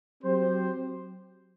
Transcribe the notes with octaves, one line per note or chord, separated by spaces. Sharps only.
F#3 C4 G4 C5